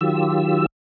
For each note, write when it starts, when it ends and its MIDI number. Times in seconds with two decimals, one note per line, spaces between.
0.01 0.66 51
0.01 0.66 54
0.01 0.66 65
0.01 0.66 67
0.01 0.66 88